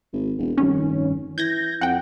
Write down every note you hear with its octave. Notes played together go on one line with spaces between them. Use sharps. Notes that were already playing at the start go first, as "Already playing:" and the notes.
G#1
E1
F1 G2 D#3 C#4
E3 G6 G#6 A#6
F2 F#5 G5